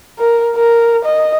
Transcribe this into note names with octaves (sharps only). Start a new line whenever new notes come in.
A#4
A#4
D#5